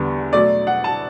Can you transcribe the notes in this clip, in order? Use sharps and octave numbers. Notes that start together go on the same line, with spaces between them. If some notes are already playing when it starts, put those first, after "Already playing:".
Already playing: E2 D3 G3 B3
B2 F#3 A3 D5
F#5
A5